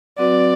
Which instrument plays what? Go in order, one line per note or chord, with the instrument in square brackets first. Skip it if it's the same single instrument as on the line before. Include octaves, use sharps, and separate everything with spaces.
[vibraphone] F#3 C4 F#4 B4 [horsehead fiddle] D5